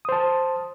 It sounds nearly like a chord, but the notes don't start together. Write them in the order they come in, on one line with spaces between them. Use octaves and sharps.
D#6 C5 A5